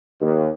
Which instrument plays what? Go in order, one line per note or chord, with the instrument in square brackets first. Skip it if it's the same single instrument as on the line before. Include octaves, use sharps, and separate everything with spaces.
[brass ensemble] D#2